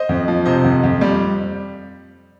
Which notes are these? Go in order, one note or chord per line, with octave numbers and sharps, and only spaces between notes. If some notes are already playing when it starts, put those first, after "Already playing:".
Already playing: C5 D#5
F2
F3
C3 C5 D#5
F2
F2
G3